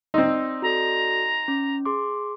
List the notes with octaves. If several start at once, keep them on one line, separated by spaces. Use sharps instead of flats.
C4 D#4 D5 C6 E6
F#4 A4 D5 A#5
C#4
G#4 C6 D6